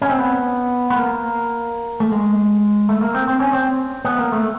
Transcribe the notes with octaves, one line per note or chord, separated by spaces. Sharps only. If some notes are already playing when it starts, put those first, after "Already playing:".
C#4
C4
B3
B3
A#3
A3
G#3
A3
A#3
C4
C4
C#4
C4
B3
A#3
A3